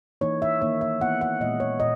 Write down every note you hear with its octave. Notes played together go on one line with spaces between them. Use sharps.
E3 A#3 D#4 C#5
E5
D#3 A#3 D#4 C#5
E5
E3 B3 E4 F#5
F#5
A#2 G#3 B3 D#5
C#5
A#2 D#5